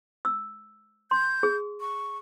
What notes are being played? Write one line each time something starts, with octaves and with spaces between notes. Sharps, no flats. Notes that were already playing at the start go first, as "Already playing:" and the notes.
E6
C6 G6
G#4
C#6